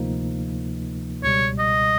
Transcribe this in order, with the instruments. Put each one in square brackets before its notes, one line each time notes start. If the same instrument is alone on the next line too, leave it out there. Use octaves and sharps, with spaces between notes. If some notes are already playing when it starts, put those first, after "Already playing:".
Already playing: [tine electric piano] D2 C3 F3 A#3 D#4
[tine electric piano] C#2 B2 G3 [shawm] C#5
[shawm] D#5